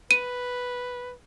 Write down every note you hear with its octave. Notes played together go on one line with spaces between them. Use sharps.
B4 D#7